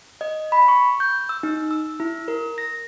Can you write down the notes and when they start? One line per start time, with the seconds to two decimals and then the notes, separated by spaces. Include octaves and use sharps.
0.21 D#5
0.52 B5
0.68 C#6
1.00 G6
1.29 E6
1.43 D#4
1.71 E6
2.00 E4
2.28 A#4
2.58 A#6